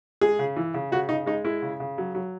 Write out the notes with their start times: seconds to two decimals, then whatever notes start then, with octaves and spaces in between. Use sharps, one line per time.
0.21 G#3 G#4
0.39 C#3
0.56 E3
0.74 C#3
0.92 C#3 F#4
1.09 C#3 D#4
1.26 G#3 D#4
1.44 G#3 E4
1.62 C#3
1.80 C#3
1.98 F#3
2.15 F#3